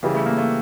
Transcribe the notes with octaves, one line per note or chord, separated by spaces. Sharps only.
C#3 E3 G3
A3
A#3
A3